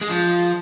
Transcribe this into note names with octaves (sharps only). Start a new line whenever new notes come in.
G#3
F3